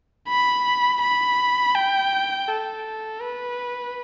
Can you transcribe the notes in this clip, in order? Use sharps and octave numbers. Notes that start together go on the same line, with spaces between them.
B5
B5
G5
A4
B4